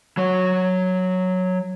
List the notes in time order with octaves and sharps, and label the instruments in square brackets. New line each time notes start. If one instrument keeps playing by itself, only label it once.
[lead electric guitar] F#3 C#5